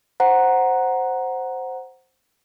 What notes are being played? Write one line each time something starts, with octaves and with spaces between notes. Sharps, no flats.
C5 F#5 A#5